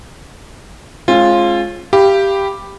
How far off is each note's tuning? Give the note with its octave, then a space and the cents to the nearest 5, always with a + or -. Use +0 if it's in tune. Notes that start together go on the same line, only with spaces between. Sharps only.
G#3 +25 C#4 -45 F4 +0
G4 +0 F5 -30 B5 +0